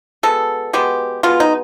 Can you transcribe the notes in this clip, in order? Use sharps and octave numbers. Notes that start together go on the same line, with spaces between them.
B2 G#3 B3 A4
B2 G#3 B3 G4
B2 G#3 B3 F4
D#4